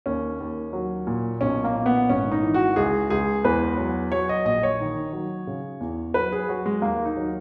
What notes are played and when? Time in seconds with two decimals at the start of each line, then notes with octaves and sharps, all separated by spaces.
0.06 D#2 C#4
0.40 D#2
0.73 F#3
1.07 A#2
1.41 B1 C#4
1.64 A#3
1.75 A#2
1.86 B3
2.09 G#1 C#4
2.32 D#4
2.43 E3
2.54 F#4
2.76 C#2 G#4
3.10 C#2 G#4
3.44 E2 B4
3.77 F#3
4.12 F#3 C#5
4.29 D#5
4.45 A#1 D#5
4.63 C#5
4.80 D#3
5.13 F#3
5.47 C#3
5.80 E2
6.14 F#3 B4
6.32 G#4
6.48 F#3 F#4
6.66 G#3
6.82 D#2 A#3
7.05 D#4
7.17 F#3